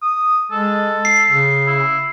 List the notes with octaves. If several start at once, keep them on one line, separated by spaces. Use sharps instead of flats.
D#6
G#3 A4
C7
C#3
E4